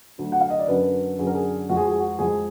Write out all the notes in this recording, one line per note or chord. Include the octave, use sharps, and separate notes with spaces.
D2 D3 F#3
F#5
F5
D#5
D5
F#2 D3 F#3 B4
F#2 D3 F#3 G#4
A#4
G#4
F2 F3 G#3 F#4
G#4
F#4
G#4
F#4
F2 F3 G#3 G#4